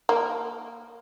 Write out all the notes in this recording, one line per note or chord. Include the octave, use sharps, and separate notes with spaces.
A#3